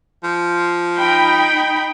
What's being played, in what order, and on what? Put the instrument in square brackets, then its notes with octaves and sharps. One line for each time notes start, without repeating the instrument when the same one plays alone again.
[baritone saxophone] F3
[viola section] D#4 G5 B5